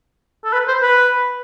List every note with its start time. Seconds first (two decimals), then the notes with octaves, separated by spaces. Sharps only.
0.44 A4
0.53 B4
0.68 C5
0.82 B4